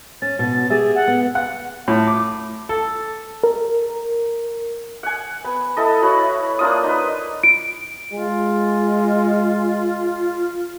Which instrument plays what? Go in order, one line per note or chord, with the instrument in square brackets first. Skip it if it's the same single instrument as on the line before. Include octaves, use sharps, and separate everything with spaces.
[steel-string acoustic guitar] C#4 [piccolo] A6
[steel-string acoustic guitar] B2 F#4
G4 G#4 E5
[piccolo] F#5
[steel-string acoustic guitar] B3
[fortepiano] F#5
A2
D6
A4
[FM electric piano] A#4
[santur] F#5 G#5
B3
E4 A4 D#5
E4 F#4 C#5 B5
A#3 D4 F4 D#6
D#4 B4
[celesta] D7
[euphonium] G#3 [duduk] F4